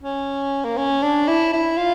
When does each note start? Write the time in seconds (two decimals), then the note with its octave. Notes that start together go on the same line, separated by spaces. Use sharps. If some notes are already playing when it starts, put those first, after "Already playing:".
0.03 C#4
0.65 A#3
0.78 C#4
1.02 D4
1.28 E4
1.53 E4
1.77 F4